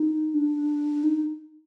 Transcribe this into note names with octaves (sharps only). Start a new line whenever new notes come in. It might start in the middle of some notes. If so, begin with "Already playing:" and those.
Already playing: D#4
D4
D#4